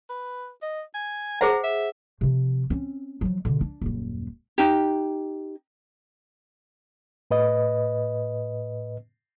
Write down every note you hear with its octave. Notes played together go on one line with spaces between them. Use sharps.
B4
D#5
G#5
G#4 C5 F#5 A#5
E5
C3 F3
C4 C#4
F3 F#3
B2 D3
D4
D#1 F#2
D#4 G4
A2 B4 D#5